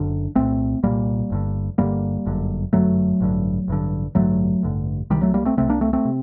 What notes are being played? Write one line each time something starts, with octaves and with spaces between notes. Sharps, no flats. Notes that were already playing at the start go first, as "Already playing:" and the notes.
Already playing: F#1 F#2 D3 D4
C2 A#2 A3 C4
C2 A#2 G3 A#3
G1 G2 D3
G1 G2 D3 G3 A#3
G1 F#2 D3
G1 F#2 D3 F#3 A3
A1 G2 D3
A1 G2 D3
A1 G2 D3 F#3 A3
A1 G2 D3
C2 C3 D#3 G3
F#3 A3
G3 A#3
A3 C4
C2 C3 A3 C4
A#3 D4
A3 C4
A3 C4
C3